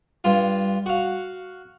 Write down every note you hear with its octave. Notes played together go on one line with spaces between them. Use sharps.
G2 F4
F#4 F5